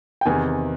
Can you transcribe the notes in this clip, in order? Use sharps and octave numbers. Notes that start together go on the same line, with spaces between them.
G5
E2 C3 D#3 G#5